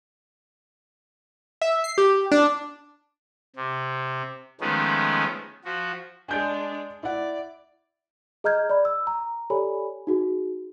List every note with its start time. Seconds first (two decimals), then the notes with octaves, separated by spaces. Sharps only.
1.62 E5
1.84 C7
1.98 G4
2.32 D4
3.56 C3
4.61 D#3 F3 G#3 A3 B3 C#4
5.65 F3 F#4
6.29 G#3 D4 G#5 G6 D7
7.03 E4 D5 F#5
8.44 G#4 D#5 A#5 F6 G6 G#6
8.70 D5 B5
8.85 E6
9.07 A#5
9.50 G4 A4 C#5 D5 G#5 B5
10.07 D#4 F#4 G#4